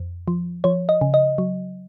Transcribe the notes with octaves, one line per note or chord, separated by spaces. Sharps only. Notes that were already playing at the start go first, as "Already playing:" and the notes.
Already playing: F2
F3
F3 C#5
D#5
C#3
D#5
F#3